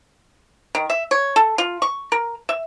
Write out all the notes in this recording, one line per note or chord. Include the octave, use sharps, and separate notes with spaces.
D#3
E5
C#5
A4
F4
C#6
A#4
E5